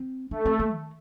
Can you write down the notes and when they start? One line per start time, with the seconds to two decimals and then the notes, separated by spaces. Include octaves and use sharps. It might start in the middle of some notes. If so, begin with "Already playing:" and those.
Already playing: C4
0.31 A3 D4
0.46 C4
0.60 A#3
0.74 D#3